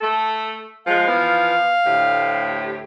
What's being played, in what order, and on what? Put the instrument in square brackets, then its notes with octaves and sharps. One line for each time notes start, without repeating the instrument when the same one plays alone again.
[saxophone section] A3 A4
[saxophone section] F3 G#3 [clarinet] F5
[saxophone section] E3 F3 B3
D2 A2 G4